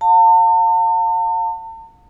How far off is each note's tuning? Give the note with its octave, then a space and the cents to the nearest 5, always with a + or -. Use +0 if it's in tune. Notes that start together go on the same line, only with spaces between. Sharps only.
F5 +40 A5 +45